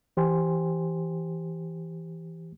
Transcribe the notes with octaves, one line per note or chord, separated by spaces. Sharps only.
E3 G4 C5 G5 G#5 C6